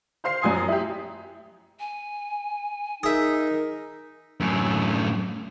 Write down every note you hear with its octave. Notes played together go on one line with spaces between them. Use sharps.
C5 F5 C6 C7
F#2 F3 G#5 D#6
E4 G4
G#5
D#4 G#4 A#4 E5
F#2 A2